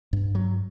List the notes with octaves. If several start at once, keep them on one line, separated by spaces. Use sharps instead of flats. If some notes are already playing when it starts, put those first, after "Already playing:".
G2
F#3